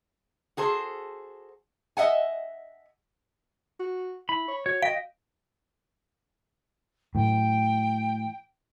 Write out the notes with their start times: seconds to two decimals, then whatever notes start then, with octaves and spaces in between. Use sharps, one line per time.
0.57 F#4 G#4 A4 C5
1.97 D#5 E5 F#5 G#5
3.80 F#4
4.29 E4 B5
4.48 C#5
4.66 F#4 C#5
4.82 F#4 D#5 F5 G5
7.15 A2 E3 F#3 G5